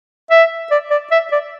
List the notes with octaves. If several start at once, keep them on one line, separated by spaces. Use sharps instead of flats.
E5
D5
D5
E5
D5